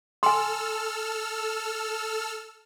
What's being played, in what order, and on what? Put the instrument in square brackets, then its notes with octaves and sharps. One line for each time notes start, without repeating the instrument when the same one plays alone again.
[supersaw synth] A4 E6 F6 [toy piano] G#5 C6